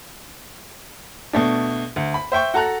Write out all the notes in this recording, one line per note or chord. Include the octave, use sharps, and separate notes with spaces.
B2 A3 D4
D2
B5
C5 E5 G5 C#6
F#4 A4 A5 A#5 F#6